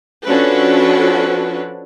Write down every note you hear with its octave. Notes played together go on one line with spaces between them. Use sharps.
F3 C#4 D4 F#4 A4 B4